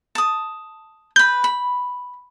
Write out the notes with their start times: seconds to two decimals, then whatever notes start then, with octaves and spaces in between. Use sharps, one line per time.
0.15 A5 D#6
1.16 B4 B5 G6
1.44 B5